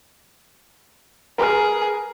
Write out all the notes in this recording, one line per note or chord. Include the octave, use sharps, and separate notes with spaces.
G#4 A#4 B4 F6